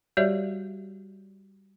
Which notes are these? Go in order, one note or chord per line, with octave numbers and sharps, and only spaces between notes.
G3 F#4 G4 C#5 D5 E5